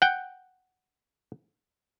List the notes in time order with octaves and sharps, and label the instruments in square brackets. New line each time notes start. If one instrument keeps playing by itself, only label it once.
[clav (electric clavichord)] F#5 G5